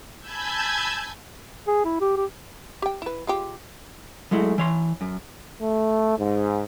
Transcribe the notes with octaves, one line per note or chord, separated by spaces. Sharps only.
G#5 A5 B5 E6 G6 G#6
G#4
E4
G4
G4
G4 G5
E4 B4
G#3 F4 G4
F#3 G#3 A3 E4
E3 C#5 C6
F#2
A3
G#2